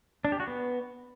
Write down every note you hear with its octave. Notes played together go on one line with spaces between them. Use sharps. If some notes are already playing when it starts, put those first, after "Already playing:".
D4
G4
F#4
B3